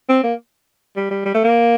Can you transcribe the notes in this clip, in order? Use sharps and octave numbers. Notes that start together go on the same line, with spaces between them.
C4
A#3
G3
G3
G3
A3
A#3